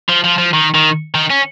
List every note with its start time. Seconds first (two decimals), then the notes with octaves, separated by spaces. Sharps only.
0.09 F3
0.24 F3
0.38 F3
0.53 D#3
0.75 D#3
1.15 D#3
1.30 C#4